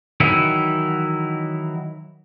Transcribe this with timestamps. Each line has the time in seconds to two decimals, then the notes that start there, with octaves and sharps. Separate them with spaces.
0.20 D#3 E3 F#3 E4